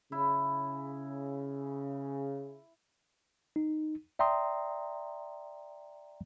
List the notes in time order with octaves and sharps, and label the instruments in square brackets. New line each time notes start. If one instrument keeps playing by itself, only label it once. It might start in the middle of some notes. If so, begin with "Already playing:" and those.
[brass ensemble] C#3 [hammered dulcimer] E4
[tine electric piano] D#4
D5 E5 G5 A#5 C6 D#6